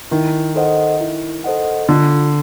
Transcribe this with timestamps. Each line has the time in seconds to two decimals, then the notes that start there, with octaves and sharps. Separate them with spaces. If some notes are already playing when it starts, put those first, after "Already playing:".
0.11 D#3 E4
0.56 A4 C5 D#5 F#5
1.00 E4
1.44 A4 C5 D#5 F#5
1.89 D3 F4